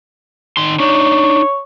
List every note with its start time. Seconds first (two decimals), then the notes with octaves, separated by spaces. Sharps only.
0.57 D#3 C6
0.80 D4 D#4 C#5